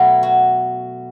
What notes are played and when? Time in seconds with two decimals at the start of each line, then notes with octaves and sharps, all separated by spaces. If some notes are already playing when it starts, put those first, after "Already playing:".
Already playing: B2 F#3 A3 E4
0.23 F#4